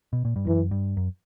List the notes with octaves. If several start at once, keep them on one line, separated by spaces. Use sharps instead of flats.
B2
A#2
G2
F#2 E3
G2
F#2